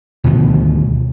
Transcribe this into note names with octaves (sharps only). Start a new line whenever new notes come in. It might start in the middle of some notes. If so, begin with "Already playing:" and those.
D2 B2 D#3 F3